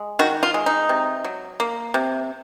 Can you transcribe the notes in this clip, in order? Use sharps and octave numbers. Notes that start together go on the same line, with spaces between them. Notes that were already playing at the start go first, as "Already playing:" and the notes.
Already playing: G#3
D#3 F#4
F4
G#3
D#4
C3
F#3
A#3
C3